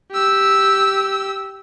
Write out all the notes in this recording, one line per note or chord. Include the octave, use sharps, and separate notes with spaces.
G4 E6